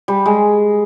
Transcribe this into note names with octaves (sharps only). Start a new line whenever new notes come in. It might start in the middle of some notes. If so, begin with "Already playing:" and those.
G3
G#3